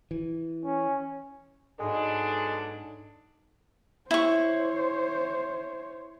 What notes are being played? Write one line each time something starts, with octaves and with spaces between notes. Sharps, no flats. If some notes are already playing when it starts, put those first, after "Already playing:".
E3
C#4
G#2 B2 F#3 G#3 D4 D#4 A4
E4 C5 C#5 C#6